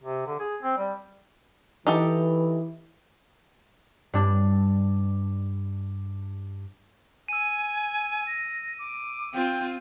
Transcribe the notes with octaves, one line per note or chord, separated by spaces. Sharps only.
C3
D3
G#4
C4
G3
E3 D#4 G4 A4
G2 D4
G#5 E6 D#7
A#6
D6
C4 F4 G5